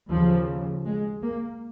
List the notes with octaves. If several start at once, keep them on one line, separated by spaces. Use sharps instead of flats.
D#2 C#3 F3
G#3
A#3